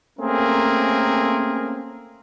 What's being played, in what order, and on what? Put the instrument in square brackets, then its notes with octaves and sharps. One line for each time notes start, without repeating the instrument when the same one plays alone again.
[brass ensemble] A3 A#3 C4 C#4 G#4 A#4